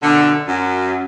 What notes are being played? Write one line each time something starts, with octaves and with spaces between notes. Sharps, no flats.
F#2 B2 D3
F#2